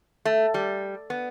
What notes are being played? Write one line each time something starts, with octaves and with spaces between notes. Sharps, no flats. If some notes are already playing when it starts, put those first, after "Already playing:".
A3
G3
B3